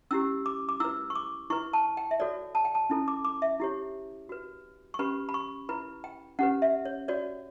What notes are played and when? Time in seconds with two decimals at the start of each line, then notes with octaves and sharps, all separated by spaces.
0.11 C#4 E4 G4 E6
0.46 D6
0.69 D6
0.80 E4 B4 E6
1.10 C#6
1.15 D6
1.50 E4 B4 C#6
1.73 A5
1.97 G5
2.11 E5
2.20 F#4 A4 C#5 D5
2.55 A5
2.65 G5
2.75 A5
2.90 C#4 E4 A4
3.08 D6
3.25 D6
3.42 E5
3.60 E4 G4 C#5
4.29 F#4 B4
4.94 C#6
4.99 C#4 G4 B4 B5
5.29 B5
5.34 C#6
5.69 E4 B4 B5
6.04 G5
6.39 C#4 G4 B4 F#5
6.62 E5
6.85 C#5
7.08 F#4 C#5 D5